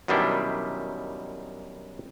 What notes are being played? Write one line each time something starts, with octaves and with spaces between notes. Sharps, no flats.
F#2 B2 D#3 G3 D4 E4